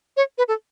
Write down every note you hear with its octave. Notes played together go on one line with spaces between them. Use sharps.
C#5
B4
A4